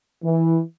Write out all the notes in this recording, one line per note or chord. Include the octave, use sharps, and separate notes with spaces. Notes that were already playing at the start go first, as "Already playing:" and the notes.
E3